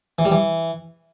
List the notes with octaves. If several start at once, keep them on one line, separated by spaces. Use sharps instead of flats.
E3
G3
E3